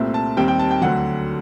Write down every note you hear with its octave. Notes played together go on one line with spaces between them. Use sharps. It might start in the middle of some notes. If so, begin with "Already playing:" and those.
Already playing: C2 A#2 A3 C4
A5
D#2 D#3 G3 C4 G5
G5
A5
G5
D2 D3 F#3 F#5